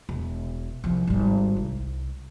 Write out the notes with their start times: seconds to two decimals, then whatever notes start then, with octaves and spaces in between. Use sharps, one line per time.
0.09 E1
0.84 C2 F3
1.07 G#1 G3
1.56 C2